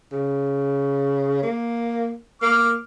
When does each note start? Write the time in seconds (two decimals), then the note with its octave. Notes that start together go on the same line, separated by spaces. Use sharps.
0.12 C#3
1.43 A#3
2.42 A#3 D6 F6